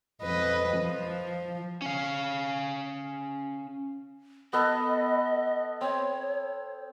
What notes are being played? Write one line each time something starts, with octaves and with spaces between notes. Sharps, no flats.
F2 B4 D#5
F3
C#4 F5
B3 A4 B4 D#5
C4 C#5